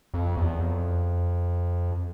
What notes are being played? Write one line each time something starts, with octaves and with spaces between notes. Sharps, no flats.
F2
E2
F2